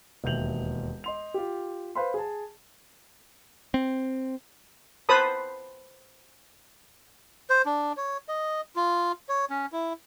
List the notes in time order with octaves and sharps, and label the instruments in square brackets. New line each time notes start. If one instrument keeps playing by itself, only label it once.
[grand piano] E1 D#2 E5 G6 F7 F#7
D#5 C6 F7
F4 G4
B4 C5 F5 B5 C6
G#4 A5
[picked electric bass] C4
[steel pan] B4 C5 A5 B5 D#6
[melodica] C5
D4
C#5
D#5
F4
C#5
C#4
E4